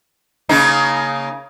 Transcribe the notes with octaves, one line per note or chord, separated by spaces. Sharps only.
C#3 A#3 D#4